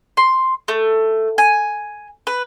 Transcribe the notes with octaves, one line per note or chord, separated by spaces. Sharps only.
C6
A3
G#5
B4